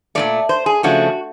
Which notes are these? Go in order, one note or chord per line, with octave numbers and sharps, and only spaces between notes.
A#2 F3 A3 D5
C5
G#4
C#3 F3 A3 D4 F#4